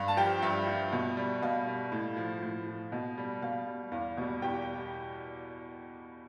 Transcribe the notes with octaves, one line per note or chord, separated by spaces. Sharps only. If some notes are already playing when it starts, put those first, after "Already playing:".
Already playing: G2 F5
A5
F3 G4 G5
G2 E5
F3
B2
G3
B2 F5
G3
A2
F3
A2
F3
B2
G3
B2 F5
G3
E2 F5
B2 G3
E2 G4 G5